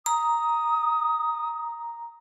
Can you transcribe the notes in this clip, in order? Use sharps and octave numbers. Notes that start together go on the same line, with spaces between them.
A#5 D#6